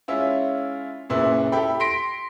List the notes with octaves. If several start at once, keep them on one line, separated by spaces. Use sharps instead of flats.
G#3 C#4 E4 F4
F#1 A#2 C#3 E4 B4
E4 G4 A4 G5 B5
C6 A#6 B6 D7